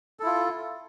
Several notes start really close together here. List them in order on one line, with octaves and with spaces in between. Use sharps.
A4 E4 F4